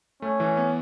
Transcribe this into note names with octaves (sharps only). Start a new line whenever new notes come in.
A3 C#4
E3
B3